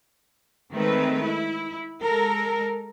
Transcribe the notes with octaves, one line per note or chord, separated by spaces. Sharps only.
D#3 G#3 A3 C4 B4
E4
G#3 A4 A#4